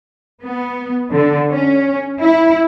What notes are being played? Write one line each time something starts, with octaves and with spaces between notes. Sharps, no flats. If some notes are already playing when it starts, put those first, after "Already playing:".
B3
D3
C#4
E4